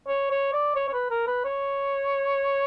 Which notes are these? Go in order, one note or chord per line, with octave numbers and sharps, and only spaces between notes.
C#5
C#5
D5
C#5
C#5
B4
A#4
B4
C#5